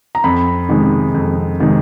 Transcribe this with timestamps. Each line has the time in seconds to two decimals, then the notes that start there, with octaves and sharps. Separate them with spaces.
0.15 A#5
0.24 F2 B5
0.69 C3 D#3 G#3
1.14 F2
1.60 C3 D#3 G#3